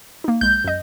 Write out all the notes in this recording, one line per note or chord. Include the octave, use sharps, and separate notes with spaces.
A#3 D#4
B1 G#3 G6
F#2 D#5